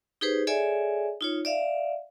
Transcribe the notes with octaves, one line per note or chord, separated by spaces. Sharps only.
D#4 G4 G#4 B4 C5
G#4 A4 C#5 D5 E5 G#5
D#4 F4 C#5
D5 E5 F5